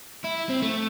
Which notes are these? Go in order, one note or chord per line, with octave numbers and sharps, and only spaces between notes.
E4
C4
A3